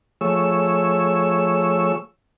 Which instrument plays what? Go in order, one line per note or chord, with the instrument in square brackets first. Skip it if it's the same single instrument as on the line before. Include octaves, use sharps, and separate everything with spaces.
[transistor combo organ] F3 A3 G#4 C#5 E6